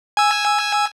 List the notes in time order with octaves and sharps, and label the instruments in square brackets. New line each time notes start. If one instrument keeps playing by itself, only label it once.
[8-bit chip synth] G#5 E6